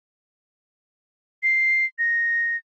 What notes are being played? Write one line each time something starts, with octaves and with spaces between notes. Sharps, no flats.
C7
A#6